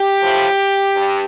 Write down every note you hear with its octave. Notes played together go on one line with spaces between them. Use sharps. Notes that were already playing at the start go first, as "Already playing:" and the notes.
Already playing: G4
A2 F3
G2